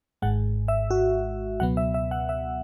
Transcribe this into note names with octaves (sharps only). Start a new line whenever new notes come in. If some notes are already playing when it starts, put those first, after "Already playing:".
G#1 G#2 G#3 F#5
E5
F#4
C#2 B2 F#3 B3 F#5
E5
E5
F#5
E5